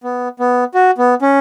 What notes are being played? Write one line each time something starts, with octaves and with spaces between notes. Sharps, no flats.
B3
B3
F#4
B3
C#4